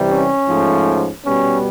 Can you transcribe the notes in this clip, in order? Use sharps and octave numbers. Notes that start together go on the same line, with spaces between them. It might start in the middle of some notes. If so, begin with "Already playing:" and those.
Already playing: C3 E3 G3
C#4
G#2 F3 A3
B2 G3 B3 C#4